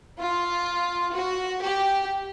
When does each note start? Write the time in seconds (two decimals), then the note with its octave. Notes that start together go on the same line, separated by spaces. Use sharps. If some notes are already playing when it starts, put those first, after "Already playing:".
0.19 F4
1.14 F#4
1.62 G4